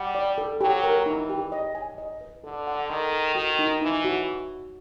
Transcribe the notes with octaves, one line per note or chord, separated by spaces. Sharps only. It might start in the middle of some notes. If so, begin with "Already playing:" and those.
Already playing: G3 F#5
D5
A4
F#3 G4
A#4
E3 D#4
G4
D#5
G#5
D#5
B4
D3 A4
F#5
D#3 A4
A4
D#3 F#4
D#4
E3 D#4
F#4